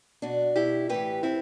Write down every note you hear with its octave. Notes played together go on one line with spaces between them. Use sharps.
B2 D4 F#4
B2 E4 G4
A2 E3 G4 B4
A2 C4 E4